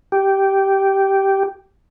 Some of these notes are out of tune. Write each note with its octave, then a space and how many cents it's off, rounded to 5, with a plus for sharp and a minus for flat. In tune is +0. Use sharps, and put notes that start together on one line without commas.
G4 -10